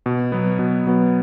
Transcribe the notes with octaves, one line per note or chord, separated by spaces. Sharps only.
B2
F#3 B3
B2
F#3 B3